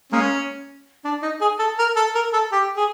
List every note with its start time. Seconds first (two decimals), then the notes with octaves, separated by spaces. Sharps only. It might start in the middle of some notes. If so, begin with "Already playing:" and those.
0.12 G#3 A#3 C#4
1.04 D4
1.22 D#4
1.41 G#4
1.59 A4
1.78 A#4
1.96 A4
2.15 A#4
2.33 A4
2.52 G4
2.77 G#4